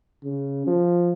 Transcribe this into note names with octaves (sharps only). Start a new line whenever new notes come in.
C#3
F3